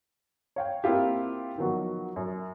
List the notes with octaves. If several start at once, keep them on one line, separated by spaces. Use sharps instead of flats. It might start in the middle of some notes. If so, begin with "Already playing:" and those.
C#5 F5 G5
A#3 C4 E4 F4 G4
D#3 F3 F#3 B3 F#4
F#2